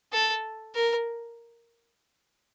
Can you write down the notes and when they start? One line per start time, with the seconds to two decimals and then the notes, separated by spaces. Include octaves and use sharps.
0.12 A4
0.75 A#4